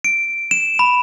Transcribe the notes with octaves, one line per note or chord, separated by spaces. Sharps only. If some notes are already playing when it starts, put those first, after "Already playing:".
D7
E7
B5